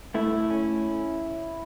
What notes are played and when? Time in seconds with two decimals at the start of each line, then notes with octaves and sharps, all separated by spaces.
0.15 A3 E4
0.50 C#4